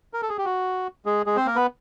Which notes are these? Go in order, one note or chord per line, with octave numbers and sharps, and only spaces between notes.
A#4
A4
G#4
G4
F#4
G#3 G#4
G#3 G#4
C4 C5
A#3 A#4
B3 B4